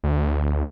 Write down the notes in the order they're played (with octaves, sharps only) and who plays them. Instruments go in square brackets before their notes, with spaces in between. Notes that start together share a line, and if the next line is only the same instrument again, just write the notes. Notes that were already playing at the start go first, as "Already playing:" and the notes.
[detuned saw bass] D2